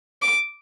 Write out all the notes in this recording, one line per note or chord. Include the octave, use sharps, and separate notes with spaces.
D6